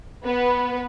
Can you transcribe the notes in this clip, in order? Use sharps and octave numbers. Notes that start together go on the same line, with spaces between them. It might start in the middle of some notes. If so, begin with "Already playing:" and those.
B3 B4